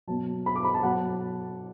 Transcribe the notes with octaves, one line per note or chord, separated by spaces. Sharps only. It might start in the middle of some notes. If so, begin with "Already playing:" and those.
B2 F#3 A5
B5
D6
B5
A5
B2 F#3 F#5